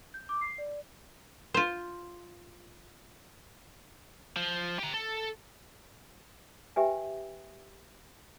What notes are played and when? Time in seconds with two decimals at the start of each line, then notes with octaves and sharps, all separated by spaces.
0.14 G6
0.29 D6
0.41 C7
0.58 D5
1.54 F4 C5
4.37 F3
4.79 G4 A#5
4.94 A4
6.76 G4 B4 E5 G5 G#5